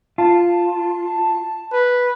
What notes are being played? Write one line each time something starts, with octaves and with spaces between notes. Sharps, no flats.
F4 A5
B4